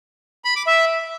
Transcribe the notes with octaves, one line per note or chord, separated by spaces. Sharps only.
B5
D6
E5